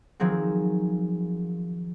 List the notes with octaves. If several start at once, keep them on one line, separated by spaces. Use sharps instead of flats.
D#3 F3 F#3 C4 G#4